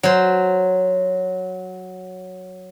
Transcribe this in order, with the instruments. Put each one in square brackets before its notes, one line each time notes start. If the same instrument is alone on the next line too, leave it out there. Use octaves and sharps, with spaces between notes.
[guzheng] F#3 C5